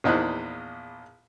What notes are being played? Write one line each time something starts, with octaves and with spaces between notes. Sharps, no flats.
A#1 E2 D#4 E4 C5 F#6